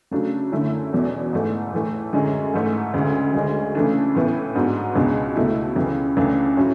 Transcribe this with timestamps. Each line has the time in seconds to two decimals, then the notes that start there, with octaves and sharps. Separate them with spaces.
0.11 C#3 F#3 A3 D4
0.52 F#2 D3 A3 C#4 E4
0.92 E2 B2 F#3
1.32 G#2 E3 A3
1.73 A2 E3 A3
2.13 F#2 D3 G#3 C#4
2.53 G#2 E3 A3 C#4
2.94 D2 C#3 G#3
3.34 D2 D3 G#3 C#4
3.75 C#3 E3 A3 D4
4.15 A2 E3 B3 E4
4.55 G#2 F#3 B3 D4
4.96 C#2 B2 G#3 D4
5.36 C#2 B2 A3 E4
5.76 C#2 C#3 E3
6.17 C#2 C#3 E3 A3 D4
6.57 A2 F#3 C#4 E4